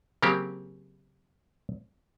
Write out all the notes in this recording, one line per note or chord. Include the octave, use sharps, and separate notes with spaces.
C#3 F#3 A#3 C4 G4 A#4